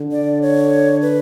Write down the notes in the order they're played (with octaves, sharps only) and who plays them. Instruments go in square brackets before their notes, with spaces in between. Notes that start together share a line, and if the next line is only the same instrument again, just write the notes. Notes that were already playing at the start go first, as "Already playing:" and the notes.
Already playing: [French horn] D3
[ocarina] D5
C#5
B4